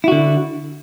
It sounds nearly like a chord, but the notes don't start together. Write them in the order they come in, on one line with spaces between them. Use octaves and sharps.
E4 F#4 D3